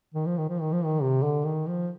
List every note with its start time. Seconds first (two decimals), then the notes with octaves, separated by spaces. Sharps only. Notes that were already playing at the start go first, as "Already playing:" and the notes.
0.14 D#3
0.26 F3
0.38 D#3
0.49 F3
0.60 D#3
0.73 F3
0.84 D#3
1.02 C3
1.23 D3
1.45 D#3
1.67 F3